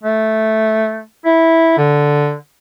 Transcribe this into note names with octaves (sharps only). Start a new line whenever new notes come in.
A3
E4
D3